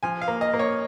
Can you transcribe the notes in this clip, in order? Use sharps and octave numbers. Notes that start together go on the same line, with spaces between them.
F3 G#5
F5
A#3
D#5
A#3
C#5